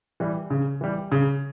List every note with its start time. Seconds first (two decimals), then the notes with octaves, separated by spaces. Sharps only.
0.20 E3 G3
0.50 C#3
0.81 E3 G3
1.12 C#3